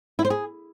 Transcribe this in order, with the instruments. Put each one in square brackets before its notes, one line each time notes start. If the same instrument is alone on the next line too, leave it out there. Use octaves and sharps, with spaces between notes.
[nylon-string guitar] E4
C5
G#4